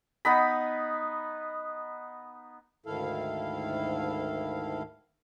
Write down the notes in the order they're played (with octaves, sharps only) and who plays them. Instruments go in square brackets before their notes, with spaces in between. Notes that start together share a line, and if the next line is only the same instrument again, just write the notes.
[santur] B3 D#4 B5
[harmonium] D2 G#2 D#3 E4 A4 F5